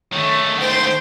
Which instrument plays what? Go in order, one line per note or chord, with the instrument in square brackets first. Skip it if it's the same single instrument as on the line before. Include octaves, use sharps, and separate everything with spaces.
[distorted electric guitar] D#3 A3 [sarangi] C#5
[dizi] C5 [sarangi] G5